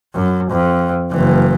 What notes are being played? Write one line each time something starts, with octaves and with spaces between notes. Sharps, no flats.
F#2
F2
F#1 E3